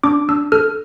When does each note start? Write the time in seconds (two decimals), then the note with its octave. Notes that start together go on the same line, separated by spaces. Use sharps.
0.04 D4 D6
0.29 D4 E6
0.52 A4 F6